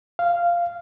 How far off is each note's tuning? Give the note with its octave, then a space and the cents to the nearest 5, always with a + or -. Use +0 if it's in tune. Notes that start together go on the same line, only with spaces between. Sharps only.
F5 -10